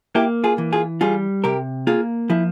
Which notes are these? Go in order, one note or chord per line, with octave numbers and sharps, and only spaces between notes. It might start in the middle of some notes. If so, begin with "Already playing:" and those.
A#3 E4 G4
F4 G#4
E3
F4 G#4
G3 F4 G#4
C3 G4 A#4
A#3 F4 G#4
F3 E4